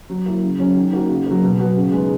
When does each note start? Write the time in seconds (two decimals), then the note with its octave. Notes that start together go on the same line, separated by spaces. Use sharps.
0.10 F#3
0.26 A#3 E4
0.43 C#3
0.59 F#3 C#4
0.76 D#3
0.93 A#3 D#4 F#4
1.09 C#3
1.27 F#3 A#3
1.43 B2
1.59 F#3 B3 F#4
1.76 C#3
1.92 G#3 B3 D#4